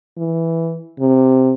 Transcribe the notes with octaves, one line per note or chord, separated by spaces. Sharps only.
E3
C3